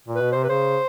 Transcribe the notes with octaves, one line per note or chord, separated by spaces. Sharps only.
A#2
B4
B2
C3 C5
B4
C#3 C5